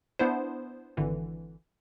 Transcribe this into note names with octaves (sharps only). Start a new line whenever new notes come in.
B3 D4 E4 C5
G#1 D3 E3